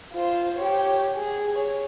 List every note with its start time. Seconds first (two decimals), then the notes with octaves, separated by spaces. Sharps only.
0.13 F4 C5
0.57 G4 C#5
1.15 G#4
1.55 C#5